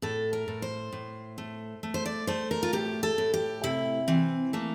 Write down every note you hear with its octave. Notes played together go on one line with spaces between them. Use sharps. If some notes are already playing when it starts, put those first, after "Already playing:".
A2 A4
A#4
A2
C5
A2
A3
A3
C5
D5
A3 C5
A#4
F4
A2 G4
A4
A2
G4
C3 E4
E3 C4
A3 A#3